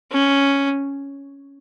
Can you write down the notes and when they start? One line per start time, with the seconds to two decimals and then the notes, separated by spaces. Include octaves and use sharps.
0.12 C#4